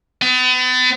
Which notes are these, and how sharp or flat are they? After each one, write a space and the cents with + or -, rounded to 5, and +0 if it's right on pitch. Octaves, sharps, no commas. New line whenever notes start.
B3 +40